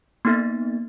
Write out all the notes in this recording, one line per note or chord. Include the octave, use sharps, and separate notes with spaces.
A#3 B3 D#4 A4 E5 A6